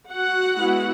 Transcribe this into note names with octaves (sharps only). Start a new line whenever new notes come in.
F#4 F#5
G#3 B3 E4